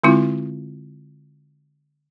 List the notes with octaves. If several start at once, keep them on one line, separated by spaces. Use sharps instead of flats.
D3 G#3 C4 E4 F4